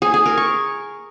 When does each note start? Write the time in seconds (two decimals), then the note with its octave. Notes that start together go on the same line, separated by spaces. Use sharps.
0.02 G#4
0.14 G#4
0.26 A#4
0.37 C#6